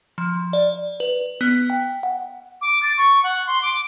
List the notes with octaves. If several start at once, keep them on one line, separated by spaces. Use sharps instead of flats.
F3
D5
B4
B3
G5
F#5
D6
A6
C#6
F#5
C6
D6